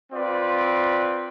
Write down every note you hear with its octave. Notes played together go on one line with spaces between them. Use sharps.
C4 F4 B4 D5